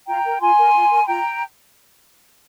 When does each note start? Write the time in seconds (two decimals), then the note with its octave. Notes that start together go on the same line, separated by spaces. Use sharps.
0.07 F4 G5 A#5
0.25 A#4
0.41 F4 G#5 C6
0.58 A#4
0.74 F4
0.90 A#4
1.03 C6
1.07 F4 G5 A#5